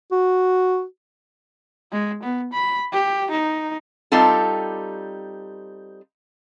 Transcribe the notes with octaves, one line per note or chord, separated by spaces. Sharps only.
F#4
G#3
B3
B5
G4
D#4
G3 C4 D#4 F4 A4